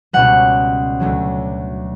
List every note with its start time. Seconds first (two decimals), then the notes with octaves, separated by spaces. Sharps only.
0.13 C#2 B2 G3 F#5
1.00 D2 D3 F#3